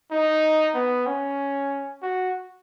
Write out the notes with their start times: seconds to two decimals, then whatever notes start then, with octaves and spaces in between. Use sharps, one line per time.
0.11 D#4
0.74 B3
1.06 C#4
2.02 F#4